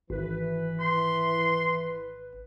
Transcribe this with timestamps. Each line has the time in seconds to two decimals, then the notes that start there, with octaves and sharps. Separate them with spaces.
0.10 G#1 E3 B4
0.80 C6